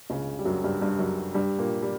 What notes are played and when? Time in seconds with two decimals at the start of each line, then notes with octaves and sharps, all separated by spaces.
0.10 C#2 C#3
0.39 G3
0.45 F#2 F#3
0.64 G2 G3
0.81 G2 G3
0.99 F#2 F#3
1.34 G2 G3
1.59 A#2 A#3
1.82 G3